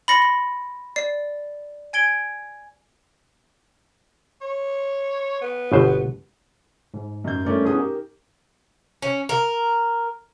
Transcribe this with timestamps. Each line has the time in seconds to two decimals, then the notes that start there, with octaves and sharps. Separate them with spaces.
0.08 B5 C6 A6 A#6 C#7
0.22 B5
0.96 D5 C7
1.93 G#5 G#6 D7 G7
4.41 C#5
5.41 B3
5.72 G1 B2 C5
6.94 G#2
7.24 F#2 G6
7.45 G2 A3 C#4 A#4 D5
7.65 E3 B3 C#4 D4 G#4 D#6
7.77 D#4 G4 A#4
9.02 C#4
9.29 A#4